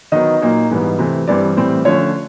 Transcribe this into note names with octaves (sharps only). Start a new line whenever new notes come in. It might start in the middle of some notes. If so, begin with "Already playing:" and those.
D#3 F#3 B3 D#4 D#5
A#2 F#3 A#3 D#4
G#2 E3 G3 B3
C3 E3 A3 C4
G2 E3 G3 C4 D5
A2 E3 G3 C4
D3 F3 A3 C#4 C#5